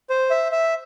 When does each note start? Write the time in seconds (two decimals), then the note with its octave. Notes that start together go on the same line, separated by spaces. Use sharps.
0.10 C5
0.31 E5
0.52 E5